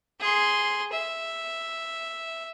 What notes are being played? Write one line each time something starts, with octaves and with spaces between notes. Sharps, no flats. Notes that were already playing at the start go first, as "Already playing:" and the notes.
G#4 C6
E5